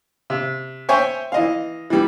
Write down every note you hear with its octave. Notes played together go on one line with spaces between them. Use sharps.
C3
C5 C#5 E5 G5 G#5 C#6
E3 D#5 F5
E3 G3